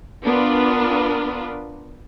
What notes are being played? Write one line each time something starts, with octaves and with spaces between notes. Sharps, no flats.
B3 D4 F4 A#4 B4